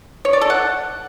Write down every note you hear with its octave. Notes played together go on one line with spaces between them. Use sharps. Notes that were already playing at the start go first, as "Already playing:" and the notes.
C#5
D5
A4
F#5